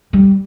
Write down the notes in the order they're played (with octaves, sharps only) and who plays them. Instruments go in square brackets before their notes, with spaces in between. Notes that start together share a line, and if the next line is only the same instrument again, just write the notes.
[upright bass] G3